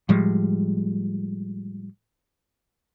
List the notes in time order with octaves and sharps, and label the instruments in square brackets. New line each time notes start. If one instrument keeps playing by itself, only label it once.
[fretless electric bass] A2 F3 G3 G#3